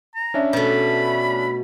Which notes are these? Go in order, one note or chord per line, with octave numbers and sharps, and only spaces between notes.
A#5
C#4 D4 E5
B2 A3 B5